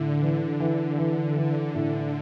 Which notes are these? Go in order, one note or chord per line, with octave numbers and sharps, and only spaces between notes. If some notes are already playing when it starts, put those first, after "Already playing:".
Already playing: A2 D3
E3
E3
D3 E3
D3 E3
A2 D3